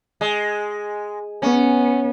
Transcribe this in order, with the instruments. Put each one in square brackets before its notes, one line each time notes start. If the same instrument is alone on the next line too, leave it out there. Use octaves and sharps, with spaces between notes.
[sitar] G#3
[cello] B3 [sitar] C#4